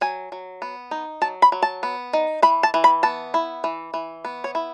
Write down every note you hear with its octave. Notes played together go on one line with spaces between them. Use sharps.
F#3 G#5
F#3
B3
D#4
F#3 A5
B5
F#3
A5
B3
D#4
E3 B5
A5
E3
B5
B3 A5
E4
E3
E3
B3
C#5
E4